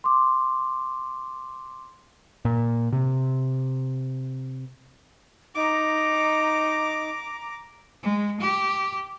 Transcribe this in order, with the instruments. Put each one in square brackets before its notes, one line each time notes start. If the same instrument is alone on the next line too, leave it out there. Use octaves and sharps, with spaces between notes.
[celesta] C6 D6
[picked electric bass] A#2
C3
[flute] D#4 [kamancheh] A#5 D6
[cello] G#3
G4